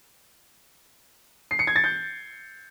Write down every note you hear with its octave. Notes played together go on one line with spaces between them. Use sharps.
C7
C#7
G#6
A6
G6